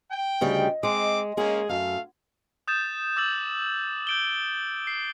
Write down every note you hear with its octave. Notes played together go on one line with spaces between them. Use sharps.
G5
D2 C#3 G3 D#5
G#3 C4 D6
G#3 A#3 C#4 G#4
F#2 A3 F5
D#6 G6 A6 E7
D6 E6 A6 F#7
G6 D7 G7
C7